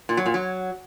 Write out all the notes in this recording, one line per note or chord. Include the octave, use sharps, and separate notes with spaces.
A#2
F#3
A#2
F#3